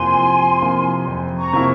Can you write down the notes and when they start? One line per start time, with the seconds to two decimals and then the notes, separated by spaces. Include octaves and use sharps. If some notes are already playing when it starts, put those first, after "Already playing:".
Already playing: F2 C3 F3 A#3 E4 G#5 C6
0.16 F2
0.62 C3 F3 A#3 E4
1.07 F2
1.37 A#5 C#6
1.53 C3 F3 A#3 E4